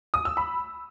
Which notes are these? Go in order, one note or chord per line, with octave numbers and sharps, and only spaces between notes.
D#6
E6
B5